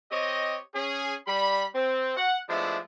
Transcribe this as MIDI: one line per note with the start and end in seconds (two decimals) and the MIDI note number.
0.12 0.57 60
0.12 0.57 67
0.12 0.57 73
0.12 0.57 75
0.75 1.16 61
0.75 1.16 68
1.27 1.66 55
1.27 1.66 83
1.75 2.15 60
2.17 2.38 78
2.49 2.78 53
2.49 2.78 56
2.49 2.78 57
2.49 2.78 59
2.49 2.78 62
2.49 2.78 64